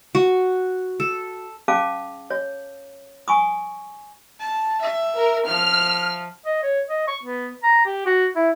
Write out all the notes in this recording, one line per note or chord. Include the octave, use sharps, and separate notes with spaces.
F#4
A4
C#4 G#4 F5 A5 D6
C#5
G#5 C#6 D#6
A5
E5
A#4
F3 F6
D#5
C#5
D#5
C#6
B3
A#5
G4
F#4
E4